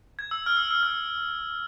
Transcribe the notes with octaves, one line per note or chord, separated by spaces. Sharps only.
G#6
E6
F6
E6
E6
F6